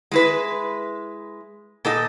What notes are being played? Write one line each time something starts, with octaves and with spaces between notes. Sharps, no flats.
G#3 E4 B4
A#2 A4 D#5